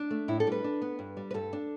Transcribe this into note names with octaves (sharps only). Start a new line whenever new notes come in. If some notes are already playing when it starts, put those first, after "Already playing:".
Already playing: D4
A3
A2 E4
A4
G3 B4
D4
B3
G2
G3
B4
G2 A4
D4